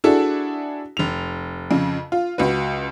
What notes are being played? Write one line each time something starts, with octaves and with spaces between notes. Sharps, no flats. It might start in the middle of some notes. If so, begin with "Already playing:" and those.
D4 E4 F#4 G#4 A4
F1 F7
F2 C#3
F4
C#2 F#4 B4